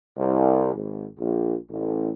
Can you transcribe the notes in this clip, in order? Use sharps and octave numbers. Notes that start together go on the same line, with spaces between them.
C2
G#1
A#1
A1